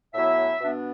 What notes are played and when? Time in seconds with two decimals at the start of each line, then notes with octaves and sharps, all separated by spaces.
0.14 A2 F#3 B3 E4 E5
0.61 B2 B3 D4